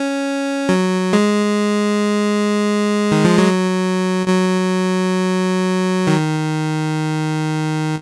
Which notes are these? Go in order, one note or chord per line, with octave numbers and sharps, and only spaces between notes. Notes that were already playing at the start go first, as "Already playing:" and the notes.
Already playing: C#4
F#3
G#3
D#3
F3
F#3
F#3
D#3